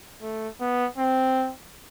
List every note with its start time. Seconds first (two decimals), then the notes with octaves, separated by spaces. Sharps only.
0.22 A3
0.60 B3
0.98 C4